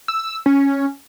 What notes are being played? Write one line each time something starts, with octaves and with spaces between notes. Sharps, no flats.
E6
C#4